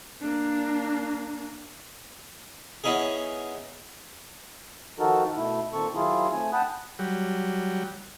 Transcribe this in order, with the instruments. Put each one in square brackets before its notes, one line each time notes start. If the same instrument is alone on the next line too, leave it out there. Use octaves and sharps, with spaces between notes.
[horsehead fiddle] A#3 D4
[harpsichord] B3 C#4 D#4 E4 G#4
[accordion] D#3 F3 D#4 F#4 A4 A#4
B2 A3 E4
A#2 D#3 C4 A4 C#6
D#3 F#3 E4 F4 G#4
A3 C4 G#5
F#5 G5 A5 B5 D#6 F#6
[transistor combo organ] F#3 G3